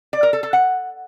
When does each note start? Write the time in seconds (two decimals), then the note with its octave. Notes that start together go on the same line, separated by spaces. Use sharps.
0.13 D5
0.23 A#4
0.33 A4
0.43 A4
0.53 F#5